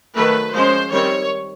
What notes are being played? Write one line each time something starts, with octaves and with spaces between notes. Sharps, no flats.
D#3 F#3 A3 B4
F3 G#3 C#4 C5
D#3 G3 C4 C#5